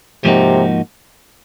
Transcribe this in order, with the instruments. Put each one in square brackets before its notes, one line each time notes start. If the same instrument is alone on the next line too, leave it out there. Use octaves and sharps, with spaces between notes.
[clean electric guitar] G#2 F3 A#3 D#4 F#4 [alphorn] C3